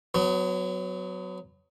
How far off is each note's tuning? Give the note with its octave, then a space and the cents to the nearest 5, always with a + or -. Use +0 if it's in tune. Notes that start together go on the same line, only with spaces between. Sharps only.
F#3 +0 B3 +30